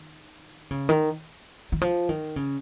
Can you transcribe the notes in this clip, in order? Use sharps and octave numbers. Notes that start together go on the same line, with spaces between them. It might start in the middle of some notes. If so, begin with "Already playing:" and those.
Already playing: D#3
C#3
D#3
D#3
F3
D#3
C#3